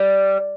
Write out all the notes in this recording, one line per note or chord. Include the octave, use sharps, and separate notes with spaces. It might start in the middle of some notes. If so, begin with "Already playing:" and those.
Already playing: G3